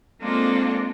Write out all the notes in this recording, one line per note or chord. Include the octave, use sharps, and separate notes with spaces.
G#3 A#3 C4 D4 F4 A4